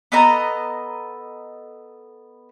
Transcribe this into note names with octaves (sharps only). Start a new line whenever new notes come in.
B3 A4 D#5 A#5